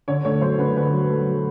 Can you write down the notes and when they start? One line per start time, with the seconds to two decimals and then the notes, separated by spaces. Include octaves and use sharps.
0.08 D3 C#5
0.25 A3 C#5
0.41 F#3 C5
0.59 D3 B4
0.76 D3 B4
0.93 F#3
1.10 A3
1.27 F#3